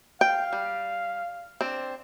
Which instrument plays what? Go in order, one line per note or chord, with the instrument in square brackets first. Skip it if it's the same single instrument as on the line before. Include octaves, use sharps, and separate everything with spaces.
[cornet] F5 [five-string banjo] G5
[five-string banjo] G3
C4 D4